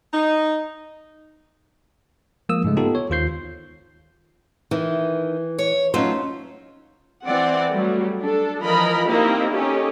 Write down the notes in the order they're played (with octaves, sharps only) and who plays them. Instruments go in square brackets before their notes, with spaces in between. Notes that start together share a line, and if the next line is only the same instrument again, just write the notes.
[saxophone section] D#4
[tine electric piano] F3 G#3 A#3 D#6 E6
G#2 C#3 G#3 A3
B3 D#4 F4 G4 A4 B4
C#5
D#2 D#3 F4 C5 G6 C7
[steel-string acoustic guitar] D#3 [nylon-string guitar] E3
[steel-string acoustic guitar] C#5
[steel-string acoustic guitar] F#3 A3 F4 [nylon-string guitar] C#4 D#4 C5
[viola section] E3 C4 D5 F#5
F#3 G3 A3
D4 A4
E3 F3 A#4 D#5 B5
A#3 C4 D#4 E4 G4 A#4
C#4 D#4 G4 A4